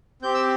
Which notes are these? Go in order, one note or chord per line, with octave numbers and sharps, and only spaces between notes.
C4 G4 G6
E6